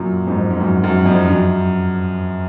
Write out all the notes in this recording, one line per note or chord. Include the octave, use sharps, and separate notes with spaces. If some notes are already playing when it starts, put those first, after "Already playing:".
Already playing: F#2 A#2
F2 G#2
G#2
F#2
F#2
F2
F#2